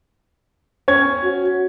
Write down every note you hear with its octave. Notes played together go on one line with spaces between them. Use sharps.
C#4 G#6
F#4